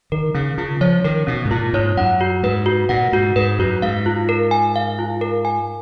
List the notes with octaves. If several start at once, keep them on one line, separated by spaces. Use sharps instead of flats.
D#3 A#4
C#3 C#4
C#3 F4
F3 C#5
D#3 A#4
B2 C#4
G#2
A#2 F4
G#2 C#5
F#2 F#5
F#4
G#2 B4
F#4
A#2 F#5
G#2 F#4
G#2 B4
F#2 F#4
G#2 F5
F4
A#4
G#5
F5
F4
A#4
G#5